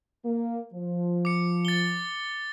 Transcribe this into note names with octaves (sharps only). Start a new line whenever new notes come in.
A#3
F3
D6 C#7
A6 G7